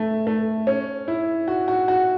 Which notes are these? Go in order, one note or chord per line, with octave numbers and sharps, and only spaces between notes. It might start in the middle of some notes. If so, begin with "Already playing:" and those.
Already playing: A3
A3
C#4
E4
F#4
F#4
F#4